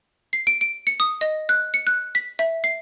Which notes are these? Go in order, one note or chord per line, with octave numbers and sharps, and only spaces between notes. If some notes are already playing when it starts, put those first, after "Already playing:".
C7
D7
D7
C#7
D#6
D#5
F#6
C#7
F#6
B6
E5
C7